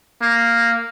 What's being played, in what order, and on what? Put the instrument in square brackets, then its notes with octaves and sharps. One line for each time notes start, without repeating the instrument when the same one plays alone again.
[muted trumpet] A#3